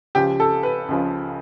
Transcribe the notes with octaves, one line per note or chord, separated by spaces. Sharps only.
C#2 C#3 F3 G4
A4
B4
C#2 C#3 F3